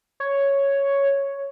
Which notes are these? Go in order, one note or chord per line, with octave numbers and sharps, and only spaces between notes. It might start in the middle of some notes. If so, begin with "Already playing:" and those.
C#5